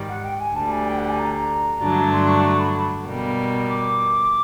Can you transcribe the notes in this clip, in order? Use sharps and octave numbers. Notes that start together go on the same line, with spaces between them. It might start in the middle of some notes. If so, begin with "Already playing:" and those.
Already playing: G#2 D#3 G3
F#5
G5
G#5
D2 D3 G3 A5
G#5
G5
F#5
G#5
A#5
A#5
G2 D3 F#3 A3 D4
C6
C#6
C#6
B5
B2 G3 A#3
D6